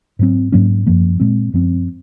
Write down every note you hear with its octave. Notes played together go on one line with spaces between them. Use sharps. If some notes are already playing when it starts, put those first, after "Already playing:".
G#2 F#3 C4
G#2 F#3 A#3 C#4
F#2 F3 A#3
A#2 G#3 C4
F#2 F3 C4